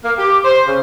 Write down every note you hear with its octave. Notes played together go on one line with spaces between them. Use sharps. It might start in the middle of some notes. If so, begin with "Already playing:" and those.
A#3
G4
C5
C#3